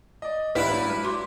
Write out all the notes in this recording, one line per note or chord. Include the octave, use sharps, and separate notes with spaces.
D5 D#5
A1 A#3 E4 G4 B4 D5 F6
F#3 D4
G#3
F#4 C6 D6